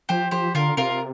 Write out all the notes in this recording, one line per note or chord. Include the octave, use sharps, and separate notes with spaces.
F3 G4 C5
F3 G4 C5
D3 F4 A#4
C3 F4 A#4